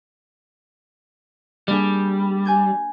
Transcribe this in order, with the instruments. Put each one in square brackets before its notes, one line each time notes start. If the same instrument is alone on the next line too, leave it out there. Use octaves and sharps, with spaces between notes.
[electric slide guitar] G3 [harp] A#3 D4 G#4
[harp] G#5 G6 G#6